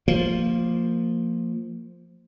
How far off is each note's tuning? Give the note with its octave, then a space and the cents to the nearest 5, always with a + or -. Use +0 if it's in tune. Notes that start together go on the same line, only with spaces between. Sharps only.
F3 +0 A#3 -25